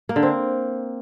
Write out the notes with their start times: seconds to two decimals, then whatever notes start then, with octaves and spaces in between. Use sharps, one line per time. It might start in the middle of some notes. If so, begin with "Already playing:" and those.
0.09 A#3
0.16 D3
0.23 C4